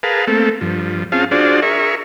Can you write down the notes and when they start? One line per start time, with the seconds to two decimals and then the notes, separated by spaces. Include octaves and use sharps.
0.03 G#4 A#4 B4 F5 A5
0.27 A3 A#3 C4 A4
0.61 G2 F3
1.12 C4 C#4 F4 G#4 F5 A5
1.31 D4 F4 F#4 G#4 C5 D5
1.62 G#4 A#4 E5 C#6